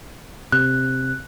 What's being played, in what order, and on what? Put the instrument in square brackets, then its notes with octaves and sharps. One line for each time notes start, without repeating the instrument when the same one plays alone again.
[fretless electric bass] C3 [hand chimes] F#6